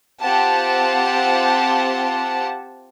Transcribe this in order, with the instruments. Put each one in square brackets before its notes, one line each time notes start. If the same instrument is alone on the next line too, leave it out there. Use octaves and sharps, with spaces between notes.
[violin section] C4 F4 G4 F#5 A5